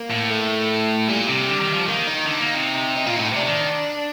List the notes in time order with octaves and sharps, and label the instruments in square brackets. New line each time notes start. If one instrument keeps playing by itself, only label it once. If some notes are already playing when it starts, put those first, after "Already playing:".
Already playing: [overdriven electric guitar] A#3
[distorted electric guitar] A2
[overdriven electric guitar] A3
[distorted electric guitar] A#2 [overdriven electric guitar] G3
[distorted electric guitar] C3
D3
D#3
F3
[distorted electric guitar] D#3 [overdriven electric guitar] A#3
[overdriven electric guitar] D#4
[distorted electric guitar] D3
A#3
C3
[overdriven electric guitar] D#4
[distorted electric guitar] A#2 [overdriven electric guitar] F4
[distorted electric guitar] A2 [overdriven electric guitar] D#4
[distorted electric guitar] C3 [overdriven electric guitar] D4
[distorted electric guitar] D#3 [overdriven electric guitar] D4